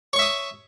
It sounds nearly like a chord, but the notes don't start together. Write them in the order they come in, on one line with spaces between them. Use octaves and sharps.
C#5 C#6 E5 D#6